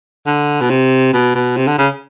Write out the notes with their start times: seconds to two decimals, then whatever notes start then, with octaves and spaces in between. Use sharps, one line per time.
0.27 D3
0.61 B2
0.70 C3
1.13 B2
1.35 B2
1.57 C3
1.67 D3
1.79 C#3